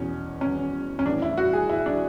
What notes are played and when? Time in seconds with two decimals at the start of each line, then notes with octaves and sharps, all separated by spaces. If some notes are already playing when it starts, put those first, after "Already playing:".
Already playing: E2 B2 C#4
0.41 C#4
0.99 C#4
1.05 E3 D4
1.08 A2
1.22 E4
1.37 F#4
1.53 G#4
1.69 E4
1.86 D4